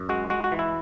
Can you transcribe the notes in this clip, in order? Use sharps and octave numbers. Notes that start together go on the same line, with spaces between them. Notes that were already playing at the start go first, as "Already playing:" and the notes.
Already playing: F#2
G#3 F#4
G#3 F#4
F#4
E3
E4